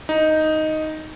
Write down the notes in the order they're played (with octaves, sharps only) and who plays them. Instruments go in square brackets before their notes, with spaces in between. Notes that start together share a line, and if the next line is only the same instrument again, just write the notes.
[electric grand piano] D#4